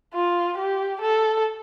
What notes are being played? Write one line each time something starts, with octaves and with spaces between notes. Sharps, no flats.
F4
G4
A4